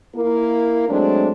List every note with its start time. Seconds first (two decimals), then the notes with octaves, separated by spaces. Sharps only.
0.15 A#3 E4 A#4
0.89 F#3 G#3 A3 C4 D4